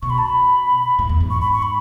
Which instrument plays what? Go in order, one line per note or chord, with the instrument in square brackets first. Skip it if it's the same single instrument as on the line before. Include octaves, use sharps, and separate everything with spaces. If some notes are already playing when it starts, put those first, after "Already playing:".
[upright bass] B2 [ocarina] C#6
[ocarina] B5
A5
B5
[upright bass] A2
E2
G#2
[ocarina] C#6
B5
C#6
B5